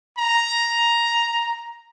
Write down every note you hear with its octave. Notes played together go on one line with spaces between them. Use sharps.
A#5